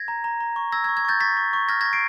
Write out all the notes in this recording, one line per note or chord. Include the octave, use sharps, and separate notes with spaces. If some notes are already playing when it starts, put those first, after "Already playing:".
Already playing: G#6 A#6
A#5
A#5
A#5
C#6
E6 G#6 A#6
G#6
C#6
G#6
C#6 G6 A6
C#6 A6 B6
C#6
C#6
F6 G#6 A#6
C#6 G#6 A#6
C7 D7